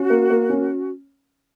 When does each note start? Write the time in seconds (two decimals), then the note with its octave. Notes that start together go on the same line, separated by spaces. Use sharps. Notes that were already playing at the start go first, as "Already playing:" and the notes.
Already playing: C#4 F#4
0.10 A#3
0.30 A#3
0.50 C#4